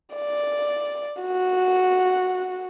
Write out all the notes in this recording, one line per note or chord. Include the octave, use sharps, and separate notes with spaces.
D5
F#4